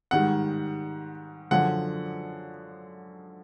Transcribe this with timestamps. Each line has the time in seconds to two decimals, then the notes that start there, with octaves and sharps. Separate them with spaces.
0.11 G#2 D#3 G3 F#5
1.51 F#2 D3 F3 F#5